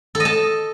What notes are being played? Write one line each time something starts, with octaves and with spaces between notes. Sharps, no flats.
A4
D#5
A5